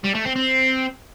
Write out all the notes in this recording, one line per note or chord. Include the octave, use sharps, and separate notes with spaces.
G3
A3
C4
C4